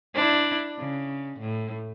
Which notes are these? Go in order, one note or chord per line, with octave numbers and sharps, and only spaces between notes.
D4 E4
C#3
A2